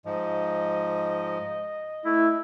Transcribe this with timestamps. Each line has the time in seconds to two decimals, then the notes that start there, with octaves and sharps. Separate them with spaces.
0.05 G#2 F3 D#5
2.05 A3 E4